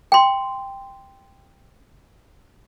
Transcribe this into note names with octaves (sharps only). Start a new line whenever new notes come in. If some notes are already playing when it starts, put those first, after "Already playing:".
G5 C6